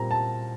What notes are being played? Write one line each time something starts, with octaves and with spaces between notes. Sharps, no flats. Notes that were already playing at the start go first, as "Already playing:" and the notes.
Already playing: A#2 G3 C4 A#5
A5